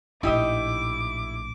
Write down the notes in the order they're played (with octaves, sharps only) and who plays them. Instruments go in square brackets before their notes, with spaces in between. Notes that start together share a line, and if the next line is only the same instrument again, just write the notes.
[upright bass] A#1 A2 [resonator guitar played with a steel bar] D#4 G4 D#5 [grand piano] E4 [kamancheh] D6